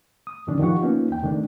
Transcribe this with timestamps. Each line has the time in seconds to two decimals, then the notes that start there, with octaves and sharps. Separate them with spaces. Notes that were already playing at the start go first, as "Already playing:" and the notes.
0.27 D#6
0.47 F2 A2 D3 D#3 C#4 D4
0.60 D#3 F3 F4 G4 F#5 C#6
0.82 A#3 B3 C#4 D#4 F4
1.10 E2 G5
1.23 C3 D#3 A3 D4